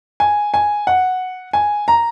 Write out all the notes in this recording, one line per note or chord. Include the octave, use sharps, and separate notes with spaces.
G#5
G#5
F#5
G#5
A#5